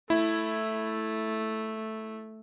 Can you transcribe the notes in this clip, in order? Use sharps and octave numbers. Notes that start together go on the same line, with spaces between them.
A3 E4